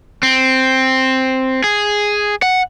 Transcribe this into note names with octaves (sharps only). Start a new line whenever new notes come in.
C4
G#4
F#5